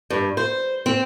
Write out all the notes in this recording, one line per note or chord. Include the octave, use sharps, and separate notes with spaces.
G2
C5
C4